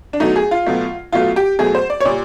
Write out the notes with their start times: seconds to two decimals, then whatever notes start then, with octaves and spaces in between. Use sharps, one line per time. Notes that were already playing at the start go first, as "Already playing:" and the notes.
0.13 D4
0.20 B2 F#3 A3 D#4
0.36 G#4
0.51 F4
0.67 B2 F#3 A3
1.13 B2 F#3 A3 F4
1.36 G4
1.59 B2 F#3 A3 G#4
1.75 C5
1.90 D5
2.00 C#5
2.05 A#2 G3 D5